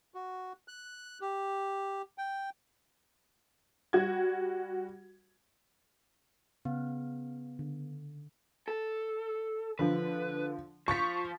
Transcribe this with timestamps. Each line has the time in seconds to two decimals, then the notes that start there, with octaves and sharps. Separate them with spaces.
0.14 F#4
0.68 F#6
1.21 G4
2.18 G5
3.93 G3 F#4 G#6
6.65 C#3 B3 F5 F#5
7.59 D3
8.68 A4
9.79 D3 F3 B4
10.88 F3 C#6 A6 B6